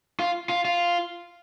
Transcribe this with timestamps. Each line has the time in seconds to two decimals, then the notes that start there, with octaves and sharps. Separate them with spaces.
0.19 F4
0.49 F4
0.65 F4